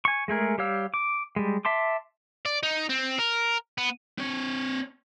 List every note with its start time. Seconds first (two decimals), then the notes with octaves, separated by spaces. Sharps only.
0.05 G#5 C#6
0.28 G#3 A3 G#4 A#4
0.58 G3 G4 C#5 F5 E6
0.94 D6
1.36 G3 G#3
1.65 E5 A5 C6 D6
2.46 D5
2.63 D#4
2.90 C4
3.19 A#4
3.78 B3
4.18 C4 C#5